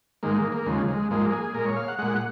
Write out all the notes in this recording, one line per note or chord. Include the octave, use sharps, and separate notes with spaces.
G#2 D#3 G#3 A#3
A#3
A#3
D#2 C#3 F3 G#3
G#3
G#2 F3 G#3 A#3
G#4
A#2 G#3 A#4
C#5
F5
F#5
A#2 G#3 F#5